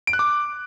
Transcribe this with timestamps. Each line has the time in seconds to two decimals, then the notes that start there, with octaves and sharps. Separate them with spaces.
0.07 D7
0.13 F#6
0.19 D6